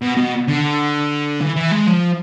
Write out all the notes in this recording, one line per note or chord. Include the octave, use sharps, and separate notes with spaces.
B2
B2
D3
E3
E3
G#3
F3